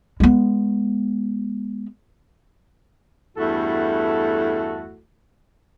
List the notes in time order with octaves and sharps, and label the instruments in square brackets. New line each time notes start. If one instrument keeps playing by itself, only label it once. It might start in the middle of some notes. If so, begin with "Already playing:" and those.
[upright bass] G#3 B3
[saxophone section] E2 G2 A3 E4 F#4 A4